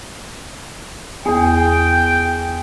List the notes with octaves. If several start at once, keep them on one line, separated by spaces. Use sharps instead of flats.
E2 B3 G#4 G5